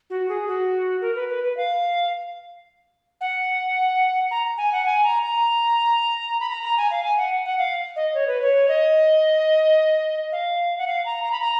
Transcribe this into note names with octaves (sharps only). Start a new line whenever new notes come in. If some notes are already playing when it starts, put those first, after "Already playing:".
F#4
G#4
F#4
A#4
B4
B4
B4
F5
F#5
A#5
G#5
F#5
G#5
A#5
A#5
B5
A#5
A#5
G#5
F5
G#5
F#5
F#5
F5
D#5
C#5
B4
C#5
D#5
F5
F#5
F5
A#5
A#5
B5
A#5